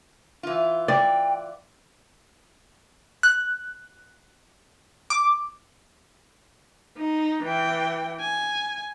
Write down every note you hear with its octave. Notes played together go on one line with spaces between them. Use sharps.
E3 F4
D5 G5
F#6
D6
D#4
E3 G5
G#5